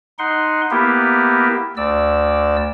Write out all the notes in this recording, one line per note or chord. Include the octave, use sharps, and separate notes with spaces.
D#4 F#5 C6
A#3 B3 E4 G4 A#4
D2 D5 E6